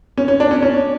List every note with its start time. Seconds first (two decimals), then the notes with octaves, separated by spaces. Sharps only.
0.18 C#4
0.28 C#4
0.40 D4
0.51 C#4
0.62 C#4